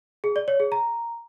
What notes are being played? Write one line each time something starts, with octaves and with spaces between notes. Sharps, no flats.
G#4
D5
C#5
G#4
A#5